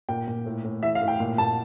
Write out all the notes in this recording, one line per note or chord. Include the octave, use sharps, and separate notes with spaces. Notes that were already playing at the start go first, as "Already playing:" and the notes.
A#2 G5
A#2
A2
A2
E3 E5
F5
A2
G5
A#2
A#2 A5